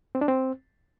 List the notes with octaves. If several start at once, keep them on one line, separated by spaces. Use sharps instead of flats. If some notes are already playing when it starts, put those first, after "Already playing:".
C4
D4
C4